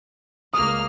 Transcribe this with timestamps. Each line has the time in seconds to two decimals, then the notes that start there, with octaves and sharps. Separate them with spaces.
0.53 C#2 A#3 D#6 F6